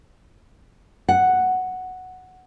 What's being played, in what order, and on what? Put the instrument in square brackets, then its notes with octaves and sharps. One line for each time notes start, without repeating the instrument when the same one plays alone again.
[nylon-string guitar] F#5